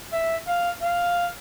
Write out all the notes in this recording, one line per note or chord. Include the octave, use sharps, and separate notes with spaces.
E5
F5
F5